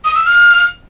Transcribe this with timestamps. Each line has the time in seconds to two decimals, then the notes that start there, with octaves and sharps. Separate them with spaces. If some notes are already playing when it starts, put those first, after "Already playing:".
0.05 D#6
0.15 E6
0.26 F6